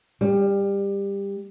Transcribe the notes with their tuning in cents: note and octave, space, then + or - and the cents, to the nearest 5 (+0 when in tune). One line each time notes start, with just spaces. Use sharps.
G3 +20